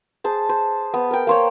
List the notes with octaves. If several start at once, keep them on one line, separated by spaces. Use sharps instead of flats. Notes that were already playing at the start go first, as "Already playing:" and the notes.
G#4 C5 A5
C5
B3
A#4 G5
A#3 C5 C#5